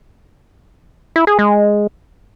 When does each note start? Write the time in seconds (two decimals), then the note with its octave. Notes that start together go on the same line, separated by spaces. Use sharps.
1.16 E4
1.27 G#4
1.39 G#3